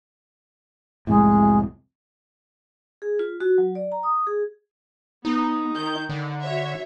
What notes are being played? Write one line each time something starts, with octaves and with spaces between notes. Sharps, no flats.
C2 F2 A2 G#3
G#4
F4
F#4
F#3
D5
A#5
D#6
G#4
B3 D#4
D#3 G6
D3 D#4 D5
F#4 C#5 E5